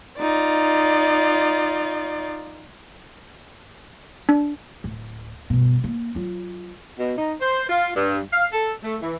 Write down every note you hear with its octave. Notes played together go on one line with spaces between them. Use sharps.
D#4 F4 D5
D4
D1
G1 B2
A#3
F#3 F4
B2
D#4
C5
F4
G2
F5
A4
A3
E3